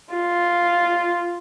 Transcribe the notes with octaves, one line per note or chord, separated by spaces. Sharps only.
F4